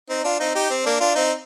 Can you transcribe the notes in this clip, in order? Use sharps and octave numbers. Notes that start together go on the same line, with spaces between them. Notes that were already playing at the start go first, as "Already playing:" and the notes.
C4 D#4
D4 F4
C4 D#4
D#4 G4
C4
A#3 D4
D4 F4
C4 D#4